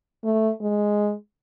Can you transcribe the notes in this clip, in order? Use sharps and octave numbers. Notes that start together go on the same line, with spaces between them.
A3
G#3